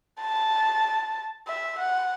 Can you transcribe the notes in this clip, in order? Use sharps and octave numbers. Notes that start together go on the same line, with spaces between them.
A5
E5
F#5